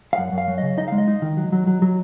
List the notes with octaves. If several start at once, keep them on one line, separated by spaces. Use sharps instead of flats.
F5
F#2 F#5
F#2
F5
F#3
C#3 D#5
D#4 D#5
G#3 F5
D#5
D#4
D#3
F#3
F#3
F#3
F#3